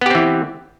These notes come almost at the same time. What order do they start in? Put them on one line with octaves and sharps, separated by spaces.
B3 G4 C4 E3